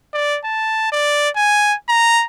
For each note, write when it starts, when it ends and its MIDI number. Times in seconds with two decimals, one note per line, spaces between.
0.14 0.39 74
0.45 0.90 81
0.92 1.29 74
1.36 1.74 80
1.89 2.25 82